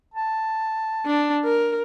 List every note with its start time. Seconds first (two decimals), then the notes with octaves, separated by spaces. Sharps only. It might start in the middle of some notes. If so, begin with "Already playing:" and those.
0.14 A5
1.06 D4
1.45 A#4